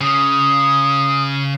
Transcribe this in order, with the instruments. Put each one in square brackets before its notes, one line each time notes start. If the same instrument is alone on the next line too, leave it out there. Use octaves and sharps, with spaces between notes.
[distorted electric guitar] C#3 [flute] D#6